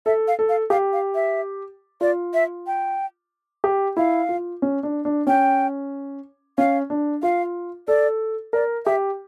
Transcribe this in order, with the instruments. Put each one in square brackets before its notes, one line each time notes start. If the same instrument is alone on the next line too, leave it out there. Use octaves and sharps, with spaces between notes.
[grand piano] A4 [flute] E5
[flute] F5
[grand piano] A4
[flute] F5
[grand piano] G4 [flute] F5
[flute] F5
E5
[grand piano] F4 [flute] D5
[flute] E5
G5
[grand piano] G4
[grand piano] E4 [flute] F5
[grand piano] F4
C#4
D4
D4
[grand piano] C#4 [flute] G5
[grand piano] C#4 [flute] F5
[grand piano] D4
[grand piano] F4 [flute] F5
[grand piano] A4 [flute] D5
[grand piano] A#4 [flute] D5
[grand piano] G4 [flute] E5